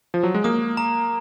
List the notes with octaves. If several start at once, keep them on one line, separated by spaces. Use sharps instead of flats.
F3
F#3
G#3
A#3 D#6
A#5